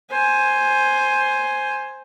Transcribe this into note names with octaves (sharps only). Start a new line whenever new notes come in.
C5 G#5